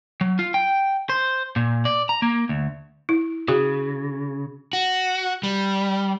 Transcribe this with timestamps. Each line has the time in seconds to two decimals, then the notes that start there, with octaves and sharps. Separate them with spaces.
0.21 F#3
0.39 F4
0.54 G5
1.09 C5
1.56 A#2
1.85 D5
2.09 A#5
2.22 A#3
2.49 D2
3.09 E4
3.48 C#3 F#4 G#4
4.73 F#4
5.43 G3